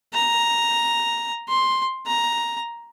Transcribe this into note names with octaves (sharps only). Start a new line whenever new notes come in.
A#5
C6
A#5